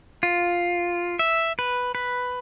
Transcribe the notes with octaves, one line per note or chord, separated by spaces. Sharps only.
F4
E5
B4
B4